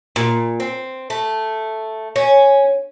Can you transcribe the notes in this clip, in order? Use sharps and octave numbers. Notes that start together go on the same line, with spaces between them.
A#2
C4
A3
C#4